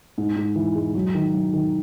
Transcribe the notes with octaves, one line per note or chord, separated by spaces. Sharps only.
G#2
G#2
E3
G#3
F#3
D#3
F#3
D#3